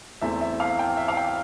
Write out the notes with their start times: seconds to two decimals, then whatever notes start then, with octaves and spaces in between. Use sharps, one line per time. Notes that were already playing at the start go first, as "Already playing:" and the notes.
0.21 E2 E3 A3 C4 E4 E5
0.41 E5
0.60 F5
0.79 G5
0.97 E5
1.08 F5
1.17 G5